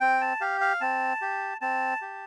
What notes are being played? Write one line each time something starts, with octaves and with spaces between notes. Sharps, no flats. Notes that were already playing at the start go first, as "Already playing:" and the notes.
C4 G5
A5
G4 F5
F5
C4 A5
G4
C4 A5
G4